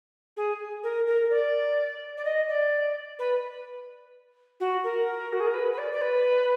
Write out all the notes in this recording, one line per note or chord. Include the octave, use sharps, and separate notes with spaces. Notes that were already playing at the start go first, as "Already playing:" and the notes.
G#4
A#4
A#4
D5
D5
D#5
D5
B4
F#4
A#4
F#4
G#4
A#4
B4
B4
D5
D5
B4